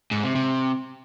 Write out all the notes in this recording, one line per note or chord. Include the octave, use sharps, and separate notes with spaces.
G#2
C3
C3